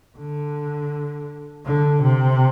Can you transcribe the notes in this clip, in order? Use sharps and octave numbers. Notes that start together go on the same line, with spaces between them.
D3
D3
C3